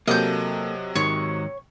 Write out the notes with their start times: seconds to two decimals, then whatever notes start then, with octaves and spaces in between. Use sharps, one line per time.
0.08 C3 F#3 A#3 A4 D#5 G6
0.96 G#2 D#3 C#5